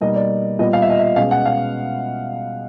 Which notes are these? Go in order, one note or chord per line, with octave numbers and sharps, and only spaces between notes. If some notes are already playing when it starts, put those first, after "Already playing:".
B2 G3 A#3 D#4 D#5
D5
A#2 G3 B3 D#5
F5
E5
D#5
E5
B2 G#3 C#4 F5
F#5
F5